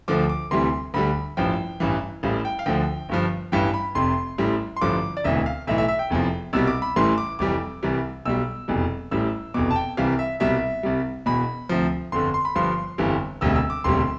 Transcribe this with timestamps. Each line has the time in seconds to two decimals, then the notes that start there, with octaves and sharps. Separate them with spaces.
0.08 D2 D3 F3 D6
0.29 D6
0.51 D2 C3 E3 G3 C6
0.94 D2 D3 G3 B5
1.37 A1 G2 F3 G5
1.80 A1 G2 E3
2.23 A1 A2 G3 F5
2.45 G5
2.59 F5
2.66 D2 D3 F3 G5
3.09 G1 G2 F3
3.52 A1 G2 E3 G5
3.74 B5
3.95 F1 F2 C3 C6
4.38 A1 A2 G3
4.76 C6
4.81 A1 G2 D3 F3 D6
5.17 D5
5.24 E1 D2 C3 E3 E5
5.46 F5
5.67 B1 A2 E3 E5
5.78 E5
5.88 E5
5.99 G5
6.10 F1 E2 C3 F3
6.53 C2 B2 G3 E6
6.67 D6
6.82 B5
6.96 A1 A2 E3 G3 C6
7.18 D6
7.39 F1 F2 E3 G3 D6
7.83 C2 C3 E3 G3
8.25 B1 B2 G3 E6
8.68 F1 E2 B2 G3
9.11 A1 A2 G3 E6
9.54 F1 E2 B2 D6
9.71 A5
9.76 G5
9.97 C2 C3 E3 G3 F5
10.19 E5
10.40 C2 B2 G3 E5
10.83 C2 C3 G3
11.26 E1 E2 B2 B5
11.69 D2 C3 F3
12.12 G1 F2 D3 C6
12.34 C6
12.45 B5
12.55 G1 G2 F3 C6
12.98 G1 F2 E3 G3
13.41 E1 D2 C3 G3 E6
13.56 E6
13.70 D6
13.84 E1 D2 C3 G3 C6